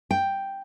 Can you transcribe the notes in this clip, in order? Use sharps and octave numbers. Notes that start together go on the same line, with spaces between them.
G5